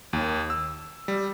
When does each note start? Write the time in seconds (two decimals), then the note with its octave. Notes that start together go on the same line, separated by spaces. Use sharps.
0.13 D#2
0.50 E6
1.08 G3